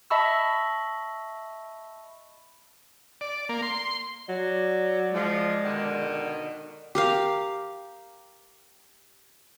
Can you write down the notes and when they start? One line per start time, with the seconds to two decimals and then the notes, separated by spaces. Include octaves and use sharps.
0.10 D#5 E5 A5 B5 C#6 E6
3.21 D5
3.49 A#3
3.63 C6
4.29 F#3 D5
5.13 F3 G#3
5.64 B2 D3 D#3
6.95 G4 A#4 F5